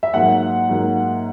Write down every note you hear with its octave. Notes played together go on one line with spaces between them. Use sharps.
E5
G#2 F#3 A#3 F#5
G#2 F#3 A#3